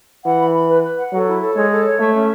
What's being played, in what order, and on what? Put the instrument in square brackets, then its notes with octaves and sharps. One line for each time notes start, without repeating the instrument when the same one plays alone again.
[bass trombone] E3 [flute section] F#5
[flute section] B5
B5
B4
B4
F#5
[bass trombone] F#3 [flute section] A4
[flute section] E4
A4
[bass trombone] G#3 [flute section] C#5
[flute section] A4
C#5
[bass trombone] A3 [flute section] E5
[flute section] C#4